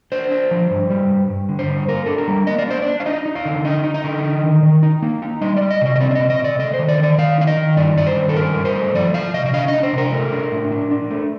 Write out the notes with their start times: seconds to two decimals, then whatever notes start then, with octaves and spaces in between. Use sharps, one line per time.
0.12 D4 C5
0.31 D4
0.51 F3
0.71 G2
0.90 G3
1.10 G2
1.30 G2
1.49 D3
1.59 C5
1.69 G2
1.89 A#3 A#4
2.06 D4 A4
2.18 A#4
2.28 G3
2.47 A#3 D#5
2.59 D5
2.67 D4 C5
2.82 D4 D5
3.00 F5
3.06 D#4 D#5
3.26 D#4
3.35 F5
3.45 D3
3.65 D#4 D#5
3.84 D#4
3.94 D#5
4.04 D3
4.23 D#4
4.44 D#3
4.63 D#3
4.83 D#4
5.02 A#3
5.22 D#4
5.41 G3 D#5
5.56 G3 D5
5.71 D#5
5.81 C3 D#5
5.96 D#5
6.00 C4 D5
6.11 D5
6.15 C3 D#5
6.30 D#5
6.39 C3
6.44 D5
6.59 A3 D#5
6.74 C5
6.79 D#3
6.89 D5
6.98 D#3
7.03 D5
7.18 D#3 F5
7.38 D#4 F5
7.47 D#5
7.57 D#3
7.77 G2 D5
7.97 G2 D5
8.07 C5
8.16 D#3
8.29 A4
8.36 G2 A#4
8.55 G2
8.65 C5
8.76 A3
8.94 F3 D5
9.14 F3 F5
9.34 C3 D#5
9.46 D#5
9.54 D4 F5
9.68 D4 D#5
9.83 C5
9.93 C3 A#4
10.12 A3
10.32 D4
10.52 A2
10.72 D4
10.91 D4
11.11 A3